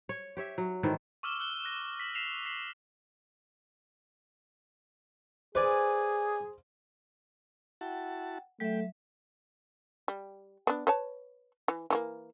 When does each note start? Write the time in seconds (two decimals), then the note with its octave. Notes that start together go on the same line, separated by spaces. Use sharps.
0.09 C#5
0.37 G4 C#5 E5
0.58 F#3
0.83 G#2 D#3 E3 A4
1.23 C#6 D6 E6 F6 E7 G7
1.40 E6 F#6 G7
1.65 F#6 A#6 D#7
2.00 B6 F#7
2.15 B6 C7 E7 F7
2.46 B6 C7 F#7
5.55 G#4 B4 C5 D5 G#5
7.81 E4 F#4 F#5 G5 A5
8.60 F#3 A3 E5 G5
10.08 G3
10.67 B3 D4
10.87 B4 C#5 A5
11.68 E3
11.90 E3 A3 A#3